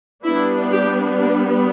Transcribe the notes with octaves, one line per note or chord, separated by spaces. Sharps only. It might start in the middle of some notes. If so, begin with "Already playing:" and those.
G3 B3 D4 E4
G4
D4